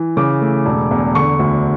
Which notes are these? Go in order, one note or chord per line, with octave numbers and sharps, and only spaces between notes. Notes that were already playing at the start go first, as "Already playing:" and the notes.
Already playing: E3
C#3 D6
A3
E1
E2
D3 C#6
D2